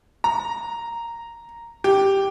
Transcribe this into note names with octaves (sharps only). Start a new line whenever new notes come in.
A#5
G4